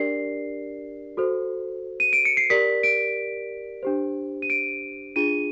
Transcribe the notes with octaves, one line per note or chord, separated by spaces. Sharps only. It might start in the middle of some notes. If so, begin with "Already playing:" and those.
Already playing: D4 G4 A#4 D5 C7
F#4 A4 C5
D#7
D7
C#7
C7
G4 A#4 D5 B6
D7
D4 G4 C5
D#7
D7
D4 F4 G#4 D#7